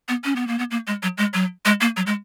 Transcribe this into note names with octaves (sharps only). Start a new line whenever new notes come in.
B3
C#4
B3
A#3
B3
A#3
G#3
F#3
G#3
F#3
G#3
A#3
F#3
G#3